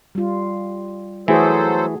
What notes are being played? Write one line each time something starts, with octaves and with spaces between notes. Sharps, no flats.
G3 F4
E3 F#3 A3 F#4 G#4 A4 C5